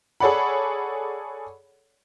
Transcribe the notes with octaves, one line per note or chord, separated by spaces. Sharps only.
G#4 A4 C#5 D5 F#5 B5